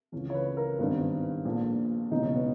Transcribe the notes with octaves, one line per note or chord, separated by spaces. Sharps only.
C#2 C#3 E3 C#4
C#5
B4
A#4
G#1 G2 D#3 B3
A#1 A#2
E1 E2 C#3 D#4
C#4
B3